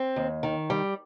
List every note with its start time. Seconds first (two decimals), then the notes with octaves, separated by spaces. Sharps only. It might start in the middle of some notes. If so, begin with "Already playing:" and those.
Already playing: C4
0.16 D#2
0.43 D#3
0.70 G3